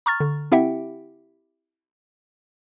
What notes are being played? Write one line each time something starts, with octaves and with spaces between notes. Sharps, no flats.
A#5 C#6 F6 A6
D3
C4 E4 G4 E5 F#5 G5